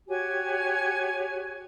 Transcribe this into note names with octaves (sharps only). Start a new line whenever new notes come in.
F#4 G4 C#5 G#5